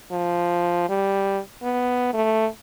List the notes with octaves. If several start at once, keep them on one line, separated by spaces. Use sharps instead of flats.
F3
G3
B3
A3